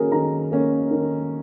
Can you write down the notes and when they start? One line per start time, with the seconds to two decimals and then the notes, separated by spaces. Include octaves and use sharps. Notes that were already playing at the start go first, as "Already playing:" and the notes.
Already playing: D#3 A#3 C#4 F#4 G#4 A#4
0.12 D#3 A#5
0.52 A#3 C#4
0.91 D#3